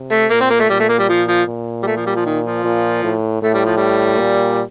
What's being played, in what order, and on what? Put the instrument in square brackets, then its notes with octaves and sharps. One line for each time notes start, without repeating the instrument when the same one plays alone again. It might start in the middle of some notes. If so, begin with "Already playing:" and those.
Already playing: [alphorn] C3
[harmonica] A3
[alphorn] A#2 [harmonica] A#3
[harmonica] C4
A#3
A3
[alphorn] A#2 [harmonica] G3
[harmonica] A3
A#3
G3
F3
F3
[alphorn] A#2
[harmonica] G3
A3
F3
G3
F3
D#3
F3
[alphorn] A#2
A2
[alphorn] A2 [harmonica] A3
[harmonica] G3
F3
G3
[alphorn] A#2